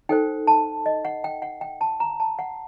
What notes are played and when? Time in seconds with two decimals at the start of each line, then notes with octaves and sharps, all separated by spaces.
0.09 D#4 A4 C5 G5
0.47 A5
0.86 D#5
1.05 F#5
1.24 G5
1.42 F#5
1.61 G5
1.81 A5
2.00 A#5
2.20 A5
2.39 F#5